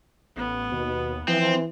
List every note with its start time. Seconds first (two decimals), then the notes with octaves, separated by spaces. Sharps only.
0.36 A1 B3
0.72 D#2 B2
1.28 E3 F3 C4